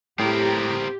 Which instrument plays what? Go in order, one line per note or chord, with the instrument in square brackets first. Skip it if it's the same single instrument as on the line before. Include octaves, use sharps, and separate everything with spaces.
[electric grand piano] A2 [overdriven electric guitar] C4 A#4 [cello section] G4